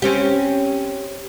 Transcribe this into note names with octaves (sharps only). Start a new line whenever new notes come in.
C4 C#4 G4